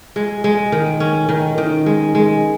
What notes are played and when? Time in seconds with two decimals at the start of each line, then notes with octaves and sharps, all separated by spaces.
0.16 G#3
0.44 G#3
0.72 D#3
1.00 C#4
1.29 D#3
1.58 D#3
1.86 G#3
2.15 G#3